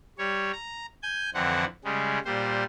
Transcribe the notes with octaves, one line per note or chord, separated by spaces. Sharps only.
G3 C#5
A#5
G#5 G6
F2 D3 E3 C4 F#5
C#3 G3 G#3
A#2 G3 C5